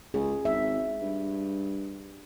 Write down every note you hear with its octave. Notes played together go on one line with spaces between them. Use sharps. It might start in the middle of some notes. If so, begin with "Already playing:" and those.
C#2 G#4
G#1 E5
G2